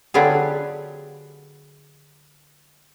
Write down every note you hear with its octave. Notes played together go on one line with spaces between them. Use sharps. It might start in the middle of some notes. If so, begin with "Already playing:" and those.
D3 F#3 B3 F4 G4 G#4